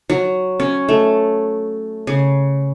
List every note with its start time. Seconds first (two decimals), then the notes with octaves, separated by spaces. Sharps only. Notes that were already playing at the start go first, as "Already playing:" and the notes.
0.10 F#3
0.60 C#4
0.89 A3
2.07 C#3